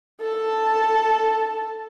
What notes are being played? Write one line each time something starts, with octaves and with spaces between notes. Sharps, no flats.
A4 A5